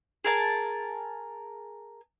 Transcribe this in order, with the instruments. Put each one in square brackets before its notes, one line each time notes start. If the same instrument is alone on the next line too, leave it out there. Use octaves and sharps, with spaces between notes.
[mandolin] G#4 A#4 A5